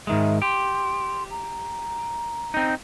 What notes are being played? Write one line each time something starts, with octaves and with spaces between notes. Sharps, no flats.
G#2 D#3 G#3 E5
G4 C6
A#5
C4 D#4